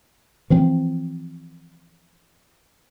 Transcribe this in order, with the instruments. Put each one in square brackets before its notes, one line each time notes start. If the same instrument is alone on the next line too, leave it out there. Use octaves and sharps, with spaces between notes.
[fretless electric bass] E3 F3 C4